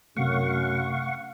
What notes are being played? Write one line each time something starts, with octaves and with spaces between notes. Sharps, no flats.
F#2 C3 A3 F5 F#5 C#6